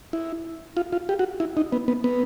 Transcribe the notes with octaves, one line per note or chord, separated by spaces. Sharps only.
E4
F4
F4
G4
F#4
E4
D#4
B3
B3
B3